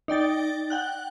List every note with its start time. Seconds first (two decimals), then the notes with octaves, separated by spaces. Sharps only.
0.08 D#4 D5 G5 A6
0.70 F#5 G5 F#6